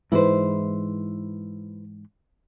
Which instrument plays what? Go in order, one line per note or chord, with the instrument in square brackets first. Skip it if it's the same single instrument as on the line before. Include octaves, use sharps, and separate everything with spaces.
[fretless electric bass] G#2 E3 G#3 [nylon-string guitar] E4 B4 C5